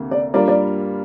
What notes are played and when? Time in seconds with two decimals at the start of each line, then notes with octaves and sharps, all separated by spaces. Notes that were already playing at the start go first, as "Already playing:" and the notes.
Already playing: D2 C3 A#3 A#4
0.11 D5
0.34 G2 G3 A#3 F4 A#4 D5
0.48 D5